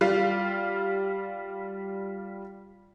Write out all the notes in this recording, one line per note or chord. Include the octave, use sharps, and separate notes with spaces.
G3 F4 F5